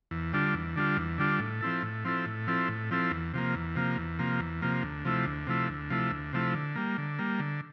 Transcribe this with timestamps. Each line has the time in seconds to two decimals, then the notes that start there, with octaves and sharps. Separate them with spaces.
0.11 E2
0.33 D3 G3 D4 F4
0.54 E2
0.76 D3 G3 D4 F4
0.97 E2
1.18 D3 G3 D4 F4
1.40 A2
1.61 F3 C4 E4 A4
1.83 A2
2.05 F3 C4 E4 A4
2.26 A2
2.47 F3 C4 E4 A4
2.68 A2
2.91 F3 C4 E4 A4
3.11 E2
3.34 C3 F3 A#3
3.54 E2
3.76 C3 F3 A#3
3.98 E2
4.19 C3 F3 A#3
4.40 E2
4.62 C3 F3 A#3
4.83 D2
5.05 C3 F3 A3 E4
5.26 D2
5.47 C3 F3 A3 E4
5.69 D2
5.90 C3 F3 A3 E4
6.11 D2
6.33 C3 F3 A3 E4
6.55 D3
6.76 G3 A#3
6.98 D3
7.19 G3 A#3
7.39 D3